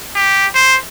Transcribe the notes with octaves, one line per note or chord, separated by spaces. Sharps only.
G4
C5